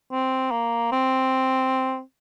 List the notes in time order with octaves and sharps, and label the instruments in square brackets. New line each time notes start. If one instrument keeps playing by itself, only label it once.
[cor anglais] C4
A#3
C4